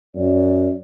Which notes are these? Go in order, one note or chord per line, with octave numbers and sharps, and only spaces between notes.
F#2 D5